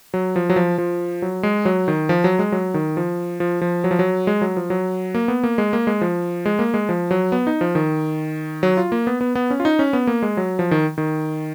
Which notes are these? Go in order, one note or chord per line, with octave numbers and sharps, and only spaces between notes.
F#3
F3
F#3
F3
F3
F#3
G#3
F#3
D#3
F3
F#3
G#3
F#3
D#3
F3
F3
F3
F#3
F3
F#3
G#3
F#3
F3
F#3
A#3
B3
A#3
G#3
A#3
G#3
F3
G#3
A#3
G#3
F3
F#3
B3
D#4
F3
D#3
F#3
F4
A#3
B3
B3
B3
C#4
F4
D#4
C#4
B3
A#3
G#3
F#3
F3
D#3
D#3